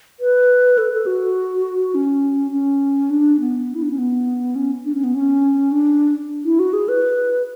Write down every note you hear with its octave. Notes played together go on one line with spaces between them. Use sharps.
B4
A4
A4
F#4
C#4
C#4
D4
B3
E4
D4
C#4
B3
C#4
D4
C#4
B3
C#4
D4
E4
F#4
G#4
B4